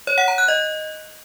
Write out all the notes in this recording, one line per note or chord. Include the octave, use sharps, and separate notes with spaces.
C#5
F#5
A#5
F#6
D#5